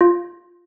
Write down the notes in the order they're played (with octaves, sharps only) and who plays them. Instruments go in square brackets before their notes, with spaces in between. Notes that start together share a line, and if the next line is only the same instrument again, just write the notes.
[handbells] F4